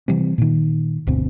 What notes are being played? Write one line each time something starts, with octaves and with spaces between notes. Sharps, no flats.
C3 E3 G3 C4
A#2 D#3
G1 D2 B2 C4